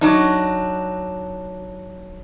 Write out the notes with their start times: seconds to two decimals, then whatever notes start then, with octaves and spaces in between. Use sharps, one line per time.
0.01 F#3 D4 D#4